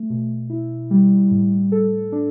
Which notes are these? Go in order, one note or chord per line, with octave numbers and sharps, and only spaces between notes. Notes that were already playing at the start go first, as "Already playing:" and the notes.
Already playing: A3
B2
E4
G3
A2
A4
D4